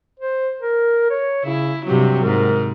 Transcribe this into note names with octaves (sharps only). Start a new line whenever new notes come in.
C5
A#4
C#5
C#3 E4
G2 C3 F#3 G4
G#2 A#4